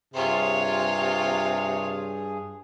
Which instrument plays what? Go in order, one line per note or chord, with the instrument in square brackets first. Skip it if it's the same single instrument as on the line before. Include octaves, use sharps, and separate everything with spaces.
[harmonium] G2 G#4 [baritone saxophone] C3 [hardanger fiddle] F4 C#5